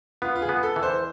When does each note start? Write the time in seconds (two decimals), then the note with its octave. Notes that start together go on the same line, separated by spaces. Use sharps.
0.22 B3 F4
0.35 F4
0.42 G#4
0.49 B3
0.63 A4
0.76 E3
0.83 C5